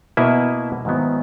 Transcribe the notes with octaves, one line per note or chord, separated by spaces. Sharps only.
B2 A#3 E4 B4 E5
G#2 D#3 F#3 B3 E4